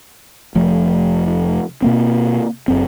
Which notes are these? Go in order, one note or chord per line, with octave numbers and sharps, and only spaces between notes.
F1 F3 A3
B2 A#3 C4
F#1 F#2 C4